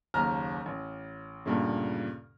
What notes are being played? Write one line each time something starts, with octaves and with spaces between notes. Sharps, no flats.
F#1 D#2 A#5 F6
A1
D2 G2 A#2 C#3